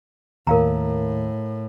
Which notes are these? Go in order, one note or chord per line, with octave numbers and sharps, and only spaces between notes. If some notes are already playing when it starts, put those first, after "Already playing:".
D#2 A2 A#4 F5 A#5